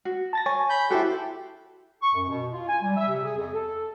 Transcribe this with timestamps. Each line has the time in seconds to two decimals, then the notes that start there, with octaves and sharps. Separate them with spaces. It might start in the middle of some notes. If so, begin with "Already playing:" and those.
0.05 F#4
0.33 A5 A6 A#6
0.46 C#5 G#5
0.70 B5 G6
0.90 E4 F#4 G4 A4 C5 G5
2.02 C#6
2.14 F#2
2.29 B2
2.52 F4
2.68 G#5
2.82 G3
2.96 E5
3.09 C3
3.24 G#4
3.37 F2
3.53 A4